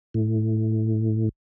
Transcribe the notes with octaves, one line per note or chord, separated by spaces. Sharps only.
A2